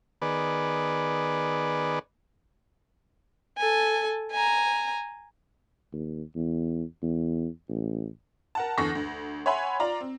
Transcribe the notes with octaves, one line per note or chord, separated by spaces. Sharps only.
D#3 B3 G#4 B4 D5
A4 G#5
G#5 A#5
D#2
E2
E2
A1
A#4 F#5 A5
E2 D3 A4 C#6 A#6
D2
C#5 E5 F#5 G#5 B5 C6
F4 D5 A#5
C4